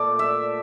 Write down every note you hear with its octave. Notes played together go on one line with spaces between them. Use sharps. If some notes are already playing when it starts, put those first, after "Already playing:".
Already playing: A#2 A3 D5
E5